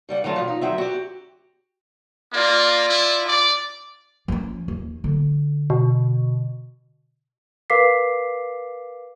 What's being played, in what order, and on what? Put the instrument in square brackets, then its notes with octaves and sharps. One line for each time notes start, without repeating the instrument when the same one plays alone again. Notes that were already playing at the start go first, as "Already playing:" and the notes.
[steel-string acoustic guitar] C#3 G3 F#5
D3 F#3 A3 F4
B2 F3
D#4
D2 F#3 C4 E5
F#4 G4
[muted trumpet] A#3 [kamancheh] F4 D5
[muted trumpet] E4
[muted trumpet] D5 [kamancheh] D6
[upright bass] F3 C#4
D#2
D3
[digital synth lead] B2
[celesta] A#4 B4 F5 D6 B6 C7